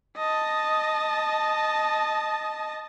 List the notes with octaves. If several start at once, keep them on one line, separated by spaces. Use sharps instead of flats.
D#5 A5